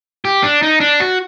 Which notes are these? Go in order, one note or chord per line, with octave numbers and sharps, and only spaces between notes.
G4
D4
D#4
D4
F#4